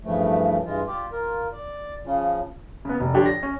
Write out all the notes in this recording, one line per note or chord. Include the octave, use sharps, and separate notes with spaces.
G2 C#3 E3 F3 A3
G2 E3 G#3 F4
F4 G4 D5
F4 A#4
D5
C#3 F3
C#3 B3
F1
D3 F3 D4 G4 C#5
A#6
C#4